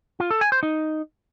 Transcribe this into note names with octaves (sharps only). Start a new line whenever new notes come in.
F4
A4
G#5
C5
D#4